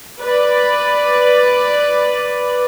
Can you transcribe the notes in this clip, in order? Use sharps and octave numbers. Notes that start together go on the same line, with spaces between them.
B4 D5